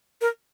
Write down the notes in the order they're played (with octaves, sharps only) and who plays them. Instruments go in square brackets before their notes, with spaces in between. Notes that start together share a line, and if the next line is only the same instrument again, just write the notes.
[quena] A#4